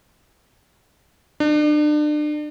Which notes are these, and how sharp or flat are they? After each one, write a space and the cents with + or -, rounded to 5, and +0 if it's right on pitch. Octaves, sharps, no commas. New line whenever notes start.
D4 +35